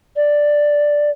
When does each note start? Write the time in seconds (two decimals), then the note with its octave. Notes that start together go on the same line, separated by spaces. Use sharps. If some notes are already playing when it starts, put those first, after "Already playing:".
0.16 D5